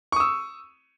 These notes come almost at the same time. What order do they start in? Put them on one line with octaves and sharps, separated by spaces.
C#6 D#6 E6